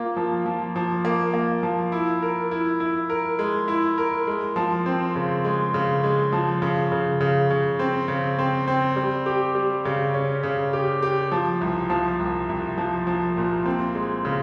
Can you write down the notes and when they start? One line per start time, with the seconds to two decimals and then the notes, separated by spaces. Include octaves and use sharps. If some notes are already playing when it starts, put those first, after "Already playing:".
Already playing: A#3 F4
0.17 F3
0.46 F3
0.76 F3
1.05 A#3
1.34 A#3
1.63 F3
1.92 E4
2.22 A#4
2.51 E4
2.80 E4
3.10 A#4
3.39 G#3
3.68 E4
3.98 A#4
4.27 G#3
4.56 F3
4.86 C4
5.15 C#3
5.44 G#3
5.74 C#3
6.03 G#3
6.33 F3
6.62 C#3
6.92 C#3
7.21 C#3
7.51 C#3
7.79 C4
8.08 C#3
8.39 C4
8.68 C4
8.96 G3
9.26 G4
9.55 G3
9.85 C#3
10.14 C#4
10.43 C#3
10.73 G4
11.02 G4
11.32 F3
11.61 C2
11.90 F3
12.20 C2
12.49 C2
12.78 F3
13.07 F3
13.37 A#2
13.66 C4
13.95 G#3
14.25 C#3